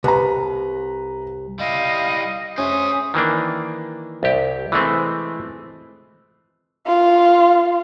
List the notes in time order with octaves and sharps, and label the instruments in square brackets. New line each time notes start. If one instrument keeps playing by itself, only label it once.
[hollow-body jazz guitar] C2 [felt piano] B4 A#5
[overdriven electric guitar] G3 E4 [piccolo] D#5 [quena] F5
[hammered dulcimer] C#4 G#4 [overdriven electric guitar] C5 G#5 [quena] E5 [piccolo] D#6
[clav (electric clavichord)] D#3 E3 A#3 D4
C2 G4
E3 G#3 A3 C4
[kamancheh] F4